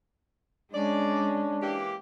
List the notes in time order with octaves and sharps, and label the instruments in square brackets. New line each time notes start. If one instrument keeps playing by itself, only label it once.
[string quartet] G#3 C#4 [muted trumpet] D4 [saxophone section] D5
[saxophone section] E3 A#3 G4